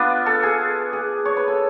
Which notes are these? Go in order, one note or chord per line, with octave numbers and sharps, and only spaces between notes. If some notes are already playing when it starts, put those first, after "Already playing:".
Already playing: B3 D4 F4 B4
A4
G#4
G#4
C#5
B4
A4